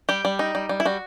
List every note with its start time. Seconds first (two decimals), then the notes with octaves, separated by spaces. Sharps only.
0.09 G3 G4
0.25 G3
0.39 D#4
0.55 G3
0.69 G3
0.80 E4
0.85 G3 F#4